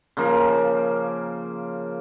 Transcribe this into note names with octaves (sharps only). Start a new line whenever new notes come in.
C#3 F3 A#3